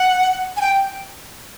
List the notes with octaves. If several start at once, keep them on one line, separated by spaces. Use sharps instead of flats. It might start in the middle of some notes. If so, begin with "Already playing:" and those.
Already playing: F#5
G#5
G5